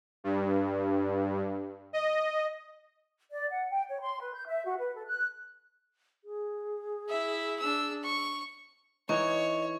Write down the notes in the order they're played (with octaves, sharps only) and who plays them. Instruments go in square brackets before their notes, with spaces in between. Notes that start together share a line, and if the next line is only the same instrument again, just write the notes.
[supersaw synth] G2
D#5
[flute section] D5
F#5
G5
C#5
C6
B4
G6
E5
F#4
B4
A4
F#6
[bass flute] G#4
[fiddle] E4 E5
D4 E6
C#6
[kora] E3 D#4 [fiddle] C#5 [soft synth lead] D#5 [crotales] C#6